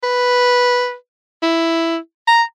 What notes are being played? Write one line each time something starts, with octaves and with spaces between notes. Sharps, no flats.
B4
E4
A#5